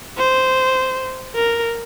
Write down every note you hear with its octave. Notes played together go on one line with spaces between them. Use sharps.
C5
A#4